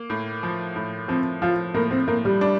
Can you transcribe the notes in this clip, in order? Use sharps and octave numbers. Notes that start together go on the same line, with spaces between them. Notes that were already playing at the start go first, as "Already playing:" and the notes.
Already playing: A#3
A2
F3
A2
F3 C4
F3 F4
A2 A#3
C4
A2 A#3
G3
D4